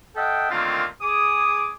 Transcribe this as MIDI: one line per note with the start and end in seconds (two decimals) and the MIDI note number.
0.15 0.48 69
0.15 0.48 75
0.15 0.48 76
0.15 0.48 78
0.15 0.48 79
0.50 0.84 50
0.50 0.84 51
0.50 0.84 57
0.50 0.84 58
0.50 0.84 60
0.50 0.84 65
1.02 1.70 68
1.02 1.70 86
1.02 1.70 87